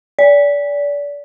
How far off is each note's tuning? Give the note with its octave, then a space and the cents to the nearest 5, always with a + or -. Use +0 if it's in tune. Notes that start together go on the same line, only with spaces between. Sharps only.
D5 -30